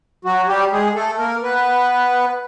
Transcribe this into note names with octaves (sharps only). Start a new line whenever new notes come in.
F#3 F#4
G3 G4
G#3 G#4
A3 A4
A#3 A#4
B3 B4